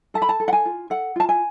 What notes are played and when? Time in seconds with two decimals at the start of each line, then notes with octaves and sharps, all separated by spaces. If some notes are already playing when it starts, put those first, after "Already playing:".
0.14 A4 A5
0.22 B5
0.29 A5
0.40 A4
0.48 F#5
0.53 G#5
0.65 F4
0.90 A4 F#5
1.16 F4 A5
1.29 G#5